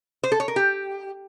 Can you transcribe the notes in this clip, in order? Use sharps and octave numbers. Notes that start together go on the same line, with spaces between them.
C5
A4
C#5
A#4
G4